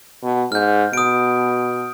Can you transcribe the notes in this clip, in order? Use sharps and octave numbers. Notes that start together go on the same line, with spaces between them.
B2
G#2 F6 G6
B2 D#6 D7